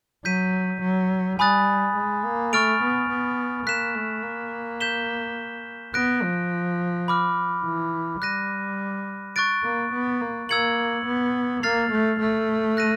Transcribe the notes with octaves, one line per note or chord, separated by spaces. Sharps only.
F#3 G6 B6 D#7
F#3
G3 G#5 B5 D#6 F#6 A6
G#3
A#3
A3 C#6 F6 A6 D7 F7
B3
B3
A#3 F#6 B6 E7
A3
A#3
G6 B6 E7 G7
B3 F#6 A#6 D7
F3
B5 D6 F6
E3
G3 F#6 A#6 D#7
C#6 F#6 A6 D7
A#3
B3
A#3
A#3 E6 G#6 C#7 F#7
B3
A#3 F6 A6 C7 F7
A3
A3
F#6 A#6 D#7